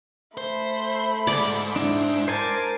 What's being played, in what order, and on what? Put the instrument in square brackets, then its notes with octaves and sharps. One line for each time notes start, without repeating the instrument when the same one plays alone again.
[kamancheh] A3 B5 [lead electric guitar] C5
[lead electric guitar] G#2 [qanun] D5
[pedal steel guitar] D4 E4
[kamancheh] A#4 D6 [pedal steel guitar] C5 G#5 A5